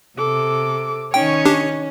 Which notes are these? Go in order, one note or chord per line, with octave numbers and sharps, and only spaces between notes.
C3 A4 D6
D#3 C#4 D#4 C#5 G5
D4 G4